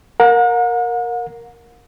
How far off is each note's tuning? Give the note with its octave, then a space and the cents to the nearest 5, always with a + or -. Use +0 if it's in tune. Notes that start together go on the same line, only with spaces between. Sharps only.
A#4 +0 F#5 -45